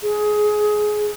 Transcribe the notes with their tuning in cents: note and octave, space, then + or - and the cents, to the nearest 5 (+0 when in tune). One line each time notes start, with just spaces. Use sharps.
G#4 +15